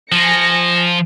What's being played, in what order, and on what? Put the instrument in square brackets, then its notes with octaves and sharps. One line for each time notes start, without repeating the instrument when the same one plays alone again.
[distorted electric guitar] F3 [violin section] G#5 A#6 C#7